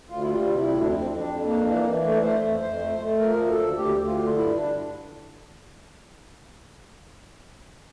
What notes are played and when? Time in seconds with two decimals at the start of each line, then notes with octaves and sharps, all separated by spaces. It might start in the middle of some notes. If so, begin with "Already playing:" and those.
0.09 D2 F4
0.22 E4
0.29 G3 F4
0.49 C3
0.58 E4
0.68 D2
0.81 D4
0.87 F2 C4
1.06 F2
1.17 D4
1.26 F2
1.45 A#3 D4
1.65 E3 D4
1.84 E3
2.03 A3 D4
2.22 A3 C5
2.42 F2
2.61 F2 C5
2.80 A3
2.99 A3
3.19 F3 A#4
3.39 D2
3.49 A4
3.59 D2
3.77 D2 G4
3.96 D2
4.06 F4
4.17 D3
4.36 G2 E4
4.55 D4